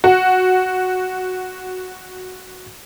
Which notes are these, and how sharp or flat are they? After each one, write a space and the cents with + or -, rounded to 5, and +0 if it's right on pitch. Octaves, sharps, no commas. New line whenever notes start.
F#4 +0